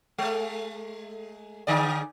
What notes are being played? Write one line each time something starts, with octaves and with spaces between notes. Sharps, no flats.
G#3 A3
D3 G#4 D5